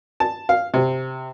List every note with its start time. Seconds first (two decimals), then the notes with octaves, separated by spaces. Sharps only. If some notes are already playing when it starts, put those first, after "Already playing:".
0.20 A5
0.49 F5
0.74 C3